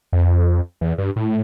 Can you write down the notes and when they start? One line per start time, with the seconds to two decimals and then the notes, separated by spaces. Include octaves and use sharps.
0.13 F2
0.81 E2
0.98 G2
1.16 A2